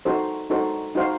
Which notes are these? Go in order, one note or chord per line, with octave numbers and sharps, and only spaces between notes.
D#4 F#4 A4 C5
D#4 F#4 A4 C5
D#4 F#4 C5 F5